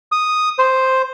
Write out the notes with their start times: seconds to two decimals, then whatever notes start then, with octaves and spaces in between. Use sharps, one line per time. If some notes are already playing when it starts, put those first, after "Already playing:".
0.12 D#6
0.59 C5